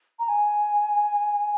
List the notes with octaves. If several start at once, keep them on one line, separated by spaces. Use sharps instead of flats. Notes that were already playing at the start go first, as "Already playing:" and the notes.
A#5
G#5